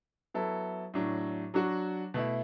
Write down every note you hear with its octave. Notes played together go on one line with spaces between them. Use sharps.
F#3 B3 E4 A4
A2 F#3 D4
F#3 D4 F#4
B2 A3 E4